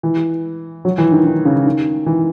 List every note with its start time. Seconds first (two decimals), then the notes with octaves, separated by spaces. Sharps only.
0.03 E3
0.85 F#3
0.98 E3
1.12 D#3
1.25 D#3
1.45 C#3
1.66 D#3
2.06 E3